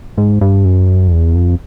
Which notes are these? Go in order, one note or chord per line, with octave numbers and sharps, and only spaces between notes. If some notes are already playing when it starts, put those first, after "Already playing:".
G#2
G2
F#2
F2
E2
F2